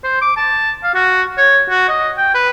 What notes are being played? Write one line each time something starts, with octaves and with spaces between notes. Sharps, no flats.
C5
D6
A5
F5
F#4
C#5
F#4
D#5
G5
B4